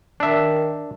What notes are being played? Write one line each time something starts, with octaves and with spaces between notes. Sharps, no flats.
D#3 D4 E5